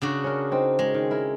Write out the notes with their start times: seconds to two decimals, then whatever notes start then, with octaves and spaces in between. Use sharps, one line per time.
0.02 C#3 D4 F#4
0.24 C#4 A#4
0.52 C4 D#4
0.79 G#3
0.94 D#3
1.11 E4 A#4